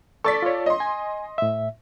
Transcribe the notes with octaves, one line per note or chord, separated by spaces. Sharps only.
A4 D5 C#6 A6 B6
F4 C#5
D#5 C6
G#5
A2 E5